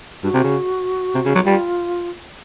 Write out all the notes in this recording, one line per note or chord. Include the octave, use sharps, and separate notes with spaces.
G2 F#4
C3
C#3
C3
C#3
F#3
G3 F4